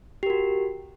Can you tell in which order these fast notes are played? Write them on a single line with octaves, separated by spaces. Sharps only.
G4 A#4 F#4